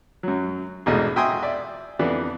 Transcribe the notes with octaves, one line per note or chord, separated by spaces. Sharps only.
F#2 F#3
A#1 E2 G#2 B2 A3 D#5
F#4 E5 G5 G#5 C6 D#6
D5 E5
F2 D3 E3 B3 D4 E4